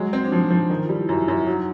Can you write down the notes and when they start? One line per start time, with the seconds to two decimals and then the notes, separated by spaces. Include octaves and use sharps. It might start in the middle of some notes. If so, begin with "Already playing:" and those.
Already playing: F#3 G#3
0.13 C4
0.25 D4
0.31 F3 D#4
0.50 F3
0.70 D#3 D#4
0.83 F4
0.89 G3
0.95 E4
1.08 F#2 E4
1.28 F#2
1.46 F#3 D#4